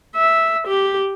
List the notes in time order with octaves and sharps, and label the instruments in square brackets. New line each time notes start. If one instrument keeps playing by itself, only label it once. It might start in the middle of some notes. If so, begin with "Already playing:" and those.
[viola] E5
G4